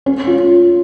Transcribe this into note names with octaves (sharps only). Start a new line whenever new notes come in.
C#4
F4